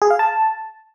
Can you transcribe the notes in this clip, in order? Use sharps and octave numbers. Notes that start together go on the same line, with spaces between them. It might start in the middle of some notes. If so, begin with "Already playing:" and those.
G#4
F5
A5